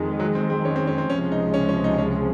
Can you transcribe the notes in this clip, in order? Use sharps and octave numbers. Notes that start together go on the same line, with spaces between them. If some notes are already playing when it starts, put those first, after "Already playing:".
Already playing: F2 D#3 G#3
F#3
C4
C4
C#4
C4
C#4
C4
C#2 C3 F3 G#3 C#4
D#4
C#4
C#4
D#4
C#4